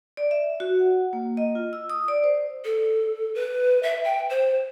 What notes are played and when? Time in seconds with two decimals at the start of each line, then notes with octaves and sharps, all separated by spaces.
0.17 D5
0.31 E5
0.60 F#4
0.79 F#5
1.13 A#3
1.37 D#5
1.55 F4
1.73 E6
1.90 D#6
2.08 D5
2.24 C5
2.64 A4
3.35 B4
3.83 E5
4.04 G5
4.30 C5